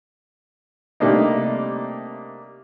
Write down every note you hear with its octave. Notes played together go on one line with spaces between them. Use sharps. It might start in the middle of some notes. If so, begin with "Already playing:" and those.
C3 G3 A3 A#3 D4 D#4